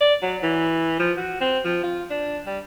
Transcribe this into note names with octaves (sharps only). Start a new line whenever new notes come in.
D5
F#3
E3
F3
F#4
C4
F3
F4
D4
G3